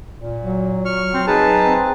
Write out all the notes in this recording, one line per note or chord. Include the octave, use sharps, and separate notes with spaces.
A#2
F#3
C#6 F6
C4
D#4 G#4 B4 A5
C4